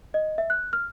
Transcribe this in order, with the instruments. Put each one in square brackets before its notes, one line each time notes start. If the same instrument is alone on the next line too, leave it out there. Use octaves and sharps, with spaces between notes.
[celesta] D#5
E5
F#6
F6